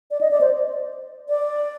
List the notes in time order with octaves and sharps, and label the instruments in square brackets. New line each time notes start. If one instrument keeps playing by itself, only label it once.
[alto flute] D5
D#5
D5
C5
D5